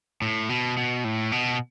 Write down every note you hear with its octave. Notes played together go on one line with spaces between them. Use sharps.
A2
B2
B2
A2
B2